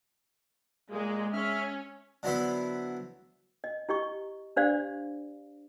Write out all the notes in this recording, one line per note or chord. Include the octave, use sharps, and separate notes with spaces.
A#2 G#3 A#3
C#4 E5 F6
D3 F#3 B3 E4 C5 B5
D#5
E4 G4 D#5 C#6
D4 G4 C5 D5 F5